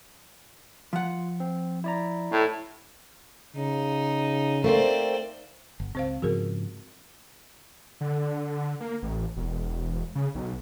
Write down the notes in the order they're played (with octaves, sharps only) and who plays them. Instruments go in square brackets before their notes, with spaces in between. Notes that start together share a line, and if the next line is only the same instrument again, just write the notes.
[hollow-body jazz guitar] F3 F#5 [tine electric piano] F4
[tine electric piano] C4
E4 D5 A#5
[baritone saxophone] A2
[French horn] C#3 [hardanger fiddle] D#4
[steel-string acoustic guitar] A3 A#3 C4 [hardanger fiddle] C5 D5
[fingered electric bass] G1
[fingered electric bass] C#2 [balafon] C4 C5 F5
[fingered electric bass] G#2 C#3 F3 [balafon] F#4 G#4 A#4
[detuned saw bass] D3
A#3
A1
E1
C#3
B1